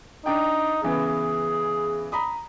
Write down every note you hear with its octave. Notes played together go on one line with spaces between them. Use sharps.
D4 D#4 G5
C#3 E3 B3 G#4
A#5 B5 D#6